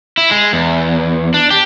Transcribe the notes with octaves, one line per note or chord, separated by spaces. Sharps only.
E4
G#3
E2
D4
G4